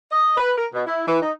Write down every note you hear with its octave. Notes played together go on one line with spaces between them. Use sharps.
D#5
B4
A#4
B2
E4
E3
D#4